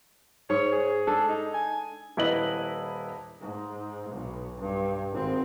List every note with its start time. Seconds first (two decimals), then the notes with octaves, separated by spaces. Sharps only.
0.50 G#2 C#5
0.72 G#4
1.07 D4 A4
1.28 D#4
1.54 G#5
2.17 D#1 E4 B4 D#5 F#7
3.40 G#2
4.10 B1 B2
4.59 G2
5.11 G#1 C4